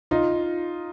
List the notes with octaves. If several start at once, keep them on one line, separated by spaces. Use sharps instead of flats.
D#4 F4